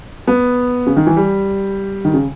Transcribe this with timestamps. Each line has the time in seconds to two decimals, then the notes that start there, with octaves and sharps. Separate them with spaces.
0.27 B3
0.87 C#3
0.97 D#3
1.07 E3
1.16 G3
2.05 D#3
2.14 C#3